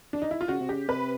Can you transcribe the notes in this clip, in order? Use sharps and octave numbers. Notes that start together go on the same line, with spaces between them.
D4
D#4
E4
F4
C#3 F#4
C3
C#3 G4
C3 B4